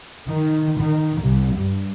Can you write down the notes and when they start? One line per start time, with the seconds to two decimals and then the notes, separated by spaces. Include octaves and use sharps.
0.28 D#3
0.79 D#3
1.22 C2
1.57 G2